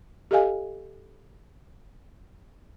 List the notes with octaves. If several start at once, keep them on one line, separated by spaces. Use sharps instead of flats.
G4 A4 D#5 F5 G#5